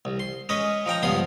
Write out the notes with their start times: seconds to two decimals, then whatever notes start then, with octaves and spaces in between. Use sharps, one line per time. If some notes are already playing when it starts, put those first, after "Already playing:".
0.05 C2
0.20 C6
0.49 G#3 C#4 B4 D#5
0.86 F3 D#4 G5 A#5
1.03 C#2 G2 F3 B3 C6 D#6